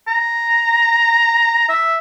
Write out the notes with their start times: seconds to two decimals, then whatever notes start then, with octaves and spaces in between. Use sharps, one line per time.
0.08 A#5
1.69 E5